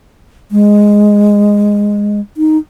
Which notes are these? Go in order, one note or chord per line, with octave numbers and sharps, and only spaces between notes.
G#3
D#4